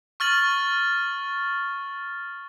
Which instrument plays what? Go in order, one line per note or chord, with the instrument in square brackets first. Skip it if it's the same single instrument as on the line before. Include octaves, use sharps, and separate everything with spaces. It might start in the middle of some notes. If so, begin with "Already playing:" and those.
[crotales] C#6 F6 A6 F#7